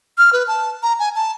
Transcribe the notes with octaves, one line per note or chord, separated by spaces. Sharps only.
F6
B4
A5
A#5
G#5
A5